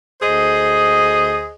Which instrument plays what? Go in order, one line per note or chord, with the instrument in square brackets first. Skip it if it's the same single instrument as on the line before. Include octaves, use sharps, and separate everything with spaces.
[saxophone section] D2 G#4 C5 D#5